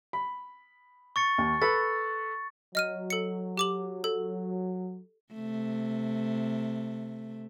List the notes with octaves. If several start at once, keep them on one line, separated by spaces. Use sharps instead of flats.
B5
C#6 A6 C#7
D#2
A4 B4 B5 A6
F#3 D#5 F6 D#7
A4 C#7
G4 D6 F#7
A4
C3 A3